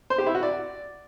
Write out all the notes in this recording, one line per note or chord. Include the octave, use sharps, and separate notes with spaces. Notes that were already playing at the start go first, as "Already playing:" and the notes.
C5
G4
E4
F#4
D5